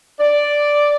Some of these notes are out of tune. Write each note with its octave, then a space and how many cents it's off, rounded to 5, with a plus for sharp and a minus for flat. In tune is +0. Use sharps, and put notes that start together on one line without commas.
D5 +0